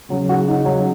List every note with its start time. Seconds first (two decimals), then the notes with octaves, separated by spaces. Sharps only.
0.10 C#3 F#3
0.29 F#4
0.47 D#4
0.65 F#3